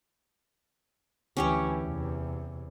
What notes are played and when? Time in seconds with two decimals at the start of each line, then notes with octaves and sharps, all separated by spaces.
1.37 D2 E3 C#4 G4 C#5
1.82 E2 C3